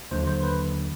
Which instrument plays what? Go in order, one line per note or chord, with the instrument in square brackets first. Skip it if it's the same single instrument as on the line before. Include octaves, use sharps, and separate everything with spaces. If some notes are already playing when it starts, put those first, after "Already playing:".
[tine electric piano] D#2 D3 F#3 C5
C5
B4